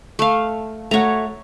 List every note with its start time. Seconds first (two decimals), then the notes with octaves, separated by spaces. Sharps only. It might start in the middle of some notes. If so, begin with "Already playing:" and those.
0.19 A3 F5
0.91 A3 F#4 C#5 F#5 A#5